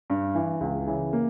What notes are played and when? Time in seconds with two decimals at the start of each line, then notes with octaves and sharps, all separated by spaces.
0.10 G2
0.35 E3
0.61 C#2
0.87 C#3 E3
1.13 A#3